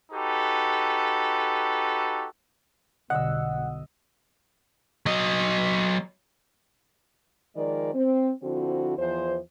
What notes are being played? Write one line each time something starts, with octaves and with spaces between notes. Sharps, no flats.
D#4 F#4 G4 A4 B4
B1 G2 B2 D3 D#5 F#5 E6
F#3 D#5
D#3 F3 G#3 A#4 D5
C4
D3 F3 C4 E4 F#4
E2 F3 C5